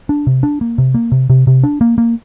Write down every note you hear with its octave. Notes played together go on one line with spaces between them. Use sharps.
D4
C3
D4
A#3
C3
A#3
C3
C3
C3
D4
A#3
A#3